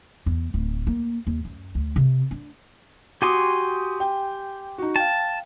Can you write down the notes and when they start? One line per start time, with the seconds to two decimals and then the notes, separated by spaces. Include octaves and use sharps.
0.26 E2
0.54 D1
0.87 A#3
1.27 D#2
1.45 F#2
1.75 D2
1.96 C3
2.31 D4
3.22 F#4 G4 G#5 C6 D6 D#6
4.00 G5
4.78 D#4 F#4
4.96 F5 G5 A5